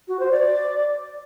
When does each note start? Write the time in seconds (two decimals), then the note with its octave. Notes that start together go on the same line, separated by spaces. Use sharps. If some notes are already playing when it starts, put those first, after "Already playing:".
0.08 F#4
0.19 C5
0.31 D5